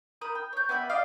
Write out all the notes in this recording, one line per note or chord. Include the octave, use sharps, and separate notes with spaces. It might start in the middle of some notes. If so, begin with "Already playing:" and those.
A#4 B5 D#6 G6
G5
C#5 G6
B3 G4 E5 B5
G4 D5 D#5 F5